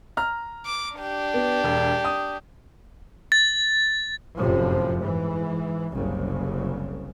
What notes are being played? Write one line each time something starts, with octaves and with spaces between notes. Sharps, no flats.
A#5 F6
D6
D4 G4
B3
E1
D#6
A6
F1 F#2 A2 C3 F3
G#2 E3
F#1 C2 C#3